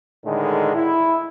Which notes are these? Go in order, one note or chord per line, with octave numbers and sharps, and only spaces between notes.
A2 D3 D#3 G#3
E4